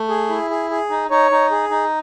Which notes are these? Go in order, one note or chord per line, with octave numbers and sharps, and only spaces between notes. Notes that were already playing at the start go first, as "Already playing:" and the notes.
Already playing: A3
G#4
E4
G#4
G#4
D#4
D#4 C#5
D#4
G#4
D#4